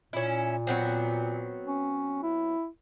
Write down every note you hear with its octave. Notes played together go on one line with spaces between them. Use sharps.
A#2 C#4 E4
F#3 B3 C4
C#4
E4